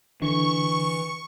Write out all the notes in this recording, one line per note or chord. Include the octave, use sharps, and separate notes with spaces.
D3 E3 C#6